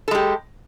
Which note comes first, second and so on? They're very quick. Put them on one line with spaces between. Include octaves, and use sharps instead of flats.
A4 G#3 G4